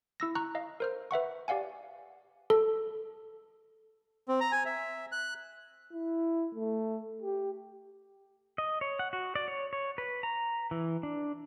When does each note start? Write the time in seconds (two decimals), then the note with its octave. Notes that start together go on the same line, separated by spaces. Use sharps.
0.20 E4 E6 A#6
0.35 A#5 C#6 F#6
0.55 D#5 F5
0.80 A#4 C5 F6
1.11 B4 E5 F#5 C#6
1.48 G4 D5 F5 F#5 G#5
2.50 A4
4.28 C4
4.41 A#5
4.52 G#5
4.65 E5
5.12 F#6
5.92 E4
6.55 A3
7.22 G4
8.58 D#5
8.81 C#5
8.99 F#5
9.13 F#4
9.35 D5
9.48 C#5
9.73 C#5
9.98 B4
10.23 A#5
10.71 E3
11.03 D4